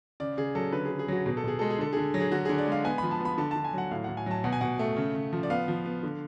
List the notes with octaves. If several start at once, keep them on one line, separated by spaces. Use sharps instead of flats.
C#3 D5
C#3 G#4
F#3 A4
D3 B4
G#4
D3
G#4
F#3 F#4
B2 G#4
A4
B2 G#4
G#3 A4
G#4
D3 A4
D3 G#4
F#3
G#4
D3 F#4
D3 G#4
D5
G#3 F5
B3 G#5
F3 B5
A5
B3 B5
D3 A5
D3 A5
G#5
F#3 F#5
A2 F5
A2 F#5
G#5
F#3 A5
B2 F#5
G#5
B2 F#5
A3
C#3
C#3
F3
D5
B3 F5
F3
B3
D3